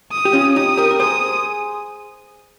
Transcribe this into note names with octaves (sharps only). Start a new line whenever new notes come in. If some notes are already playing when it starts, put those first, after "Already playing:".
D#6
G4
C#4 F4
D#4 G4 D#6
G4 A#4
A#4
G#4 C5 D#6